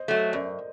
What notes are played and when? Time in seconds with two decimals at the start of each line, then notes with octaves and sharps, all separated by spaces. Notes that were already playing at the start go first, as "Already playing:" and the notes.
Already playing: C5 D#5
0.08 F#3 A3
0.33 F#2 A#4 D5